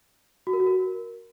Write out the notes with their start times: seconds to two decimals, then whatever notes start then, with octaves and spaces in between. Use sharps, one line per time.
0.47 F#4
0.53 A#4
0.60 F#4
0.66 A#4